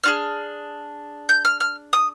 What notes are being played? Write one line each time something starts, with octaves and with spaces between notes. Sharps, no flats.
D4 F4 G#4 F6
G6
F6
F6
D#6